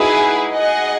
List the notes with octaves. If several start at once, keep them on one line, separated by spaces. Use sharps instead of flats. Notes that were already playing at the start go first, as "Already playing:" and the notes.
Already playing: D#4 E4 F#4 G#4 B4
G#4 D#5 F#5